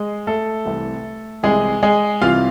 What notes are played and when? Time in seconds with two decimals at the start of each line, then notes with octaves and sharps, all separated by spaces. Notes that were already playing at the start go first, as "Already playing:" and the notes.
Already playing: G#3 G#4
0.27 A3 A4
0.65 C2 C3 E3
1.43 C2 C3 E3 G#3 G#4
1.83 G#3 G#4
2.22 C2 C3 E3 F4 F5